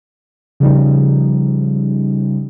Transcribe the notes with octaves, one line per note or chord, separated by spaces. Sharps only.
C#3 F3 G3 D#4